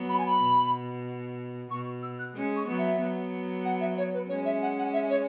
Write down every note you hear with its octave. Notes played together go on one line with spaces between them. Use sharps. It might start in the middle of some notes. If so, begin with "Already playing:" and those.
Already playing: F#3 B3
B5
G#5
B5
B2
B2 C#6
E6
F#6
G#3 C#4
C#6
F#3 B3
E5
F#3 B3
F#5
E5
C#5
B4
G#3 C#4 C#5
E5
F#5
F#5
E5
C#5